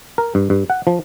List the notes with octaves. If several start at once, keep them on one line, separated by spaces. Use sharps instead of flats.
A#4
G2
G2
F#5
F3